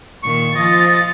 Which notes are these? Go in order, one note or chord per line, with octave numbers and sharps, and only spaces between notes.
A#2 D#3 C#6
F3 D#5 A6